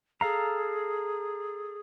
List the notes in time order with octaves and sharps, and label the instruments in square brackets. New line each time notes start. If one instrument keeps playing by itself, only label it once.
[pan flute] G#4 [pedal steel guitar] A4 F5 A#5